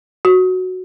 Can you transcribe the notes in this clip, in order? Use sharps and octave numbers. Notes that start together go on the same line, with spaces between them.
F#4